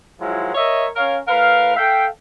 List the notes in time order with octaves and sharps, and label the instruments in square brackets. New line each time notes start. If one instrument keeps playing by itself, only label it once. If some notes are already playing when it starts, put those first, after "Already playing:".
[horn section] D#3 F3 F#3 G#3 E4 F4
A#4 C#5 D#5 E5
C#4 A#4 C#5 F5
A2 A#4 B4 F5
A4 E5 F5 G5